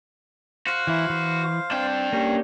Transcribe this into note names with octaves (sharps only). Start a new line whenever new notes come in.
F#4 C5 F5
E3 E4
E3
C4 D4 G5
A#3 C#4 G4